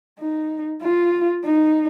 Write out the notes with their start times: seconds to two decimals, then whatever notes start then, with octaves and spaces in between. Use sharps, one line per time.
0.19 D#4
0.82 F4
1.45 D#4